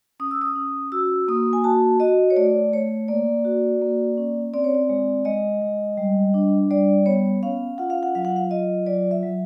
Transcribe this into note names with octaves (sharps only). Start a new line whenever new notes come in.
C#4 D#6
E6
D#6
C#4
F#4 E6
A#3 D#6
G#5
F#4 A5
F#4 D#5
C#5
A3 D5
A3 C#5
A#3 D5
F#4
A#3
C#4
C4 D5
C#5
D5
G#3
G#3 D#5
G#3
G3
D4
G3 D5
B3 C#5
C#4 F5
F4 F#5
F5
F#5
F#3 F5
F#5
F5
F4 D#5
F#3 D5
E5
F#3